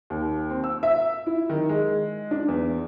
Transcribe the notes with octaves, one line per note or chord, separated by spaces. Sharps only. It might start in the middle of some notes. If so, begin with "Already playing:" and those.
D#2
C4
E6
E5
E4
D#3
G#3
D4
E2